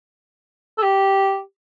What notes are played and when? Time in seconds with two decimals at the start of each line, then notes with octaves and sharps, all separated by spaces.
0.78 A4
0.82 G4